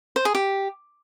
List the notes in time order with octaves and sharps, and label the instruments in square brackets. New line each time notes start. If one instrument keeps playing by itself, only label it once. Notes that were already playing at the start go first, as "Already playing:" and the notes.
[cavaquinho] C5
G#4
G4